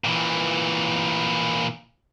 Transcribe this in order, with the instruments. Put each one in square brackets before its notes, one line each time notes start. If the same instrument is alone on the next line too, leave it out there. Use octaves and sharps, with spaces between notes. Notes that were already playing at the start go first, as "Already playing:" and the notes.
[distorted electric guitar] A#2 E3